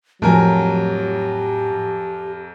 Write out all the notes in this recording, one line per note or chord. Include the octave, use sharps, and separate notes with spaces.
F2 A2 F3 F#3 G4 A#4 G#5